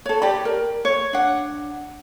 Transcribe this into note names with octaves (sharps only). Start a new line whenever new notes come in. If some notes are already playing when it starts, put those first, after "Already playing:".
A4 C#5
G4 D5 B5
A#4
C#5
D4 F#5